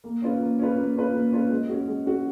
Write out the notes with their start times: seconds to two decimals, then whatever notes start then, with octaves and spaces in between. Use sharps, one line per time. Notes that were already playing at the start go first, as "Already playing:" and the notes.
0.04 A#3
0.22 C#4 F4 B4
0.41 A#3
0.59 C#4 F4 B4
0.77 A#3
0.96 C#4 F4 B4
1.13 A#3
1.32 C#4 F4 B4
1.50 G#3
1.69 C#4 F#4
1.87 G#3
2.06 C#4 F#4